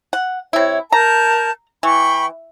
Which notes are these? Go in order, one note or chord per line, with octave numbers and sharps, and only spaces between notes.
F#5
C3 E4 C#5
A#4 A5 A#5 G6
E3 G5 B5 C#6